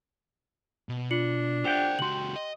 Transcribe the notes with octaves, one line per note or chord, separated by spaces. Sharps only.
B2
D4 F4 C#7 F#7
G4 C5 D5 F#5 G5
C#2 F#4 C6 F#7
D#5